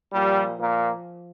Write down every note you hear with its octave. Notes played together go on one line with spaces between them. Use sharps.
A#2 F3 G3
A#2 A#3